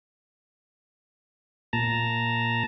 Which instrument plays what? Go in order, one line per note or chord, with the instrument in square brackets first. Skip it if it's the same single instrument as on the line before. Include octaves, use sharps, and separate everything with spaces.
[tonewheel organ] A#2 A5 A#5